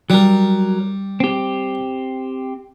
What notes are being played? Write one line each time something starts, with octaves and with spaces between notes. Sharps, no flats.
F#3 G3 A#4
C4 G4